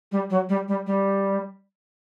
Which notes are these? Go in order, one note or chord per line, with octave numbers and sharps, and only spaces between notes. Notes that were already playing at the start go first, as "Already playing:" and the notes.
G3
F#3
G3
G3
G3